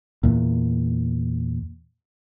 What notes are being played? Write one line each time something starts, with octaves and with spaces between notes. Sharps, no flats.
E2 A#2